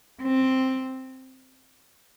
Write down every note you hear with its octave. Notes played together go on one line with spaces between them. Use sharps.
C4